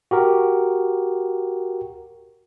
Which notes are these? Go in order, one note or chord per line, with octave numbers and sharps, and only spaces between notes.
F#4 G4 A#4